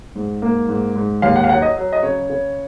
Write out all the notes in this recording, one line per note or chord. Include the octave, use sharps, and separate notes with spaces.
G#2
A#3
G#2
G#2
D#2 F5
F#5
F5
F#3 F#5
D#5
F#3
D#5
C#3 C#5
C#3